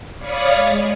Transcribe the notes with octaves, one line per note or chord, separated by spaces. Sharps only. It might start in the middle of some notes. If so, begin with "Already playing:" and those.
C#5 D5 F5 B5 C#6 D#6
G#3